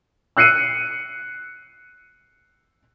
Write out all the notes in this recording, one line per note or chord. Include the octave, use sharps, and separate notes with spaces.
E6 F#6 C7 C#7 D#7